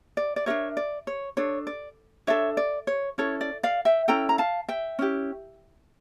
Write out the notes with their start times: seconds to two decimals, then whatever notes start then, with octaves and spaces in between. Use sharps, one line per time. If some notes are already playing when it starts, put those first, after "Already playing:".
0.17 D5
0.36 D5
0.46 D4 G4 A#4 C#5 E5
0.77 D5
1.07 C#5
1.37 D4 A4 C#5
1.67 D5
2.27 D4 A4 C#5 E5
2.57 D5
2.87 C#5
3.18 C#4 E4 A4 C#5
3.41 D5
3.63 D5 F5
3.85 E5 G5
4.08 C#4 E4 A4 G5 A#5
4.29 A#5
4.38 F5 A5
4.69 E5 G5
4.99 C#4 E4 G4